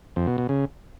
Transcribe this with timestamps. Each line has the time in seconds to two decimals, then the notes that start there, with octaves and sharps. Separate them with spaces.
0.16 F2
0.27 B2
0.38 B2
0.49 C#3